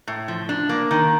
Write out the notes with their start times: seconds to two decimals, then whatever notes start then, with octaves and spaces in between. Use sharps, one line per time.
0.08 A2
0.28 F3
0.49 D4
0.69 A#3
0.91 D#3